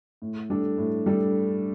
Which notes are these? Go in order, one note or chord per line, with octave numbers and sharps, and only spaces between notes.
A2
G3 D4 A4
A2
G3 D4 A4